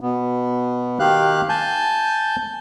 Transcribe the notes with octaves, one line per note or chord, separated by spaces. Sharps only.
B2 B3
D#3 G4 F5 F#6
G#5 A5 G6